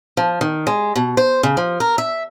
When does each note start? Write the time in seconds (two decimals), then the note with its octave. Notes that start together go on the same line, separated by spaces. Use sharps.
0.17 F3
0.41 D#3
0.67 G#3
0.96 B2
1.17 C5
1.43 C#3
1.57 F3
1.80 A#4
1.98 E5